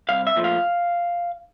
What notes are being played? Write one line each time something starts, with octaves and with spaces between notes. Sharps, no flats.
C2 F5
E5
A#2 F3 A3
F5